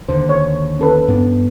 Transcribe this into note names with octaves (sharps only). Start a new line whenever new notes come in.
D#2 D3 C5
C#5
C#4 A4 B4
G2 B3 D4